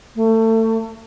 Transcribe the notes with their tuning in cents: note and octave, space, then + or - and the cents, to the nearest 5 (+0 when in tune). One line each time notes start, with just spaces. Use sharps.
A3 +25